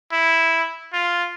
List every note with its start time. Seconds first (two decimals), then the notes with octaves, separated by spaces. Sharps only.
0.12 E4
0.93 F4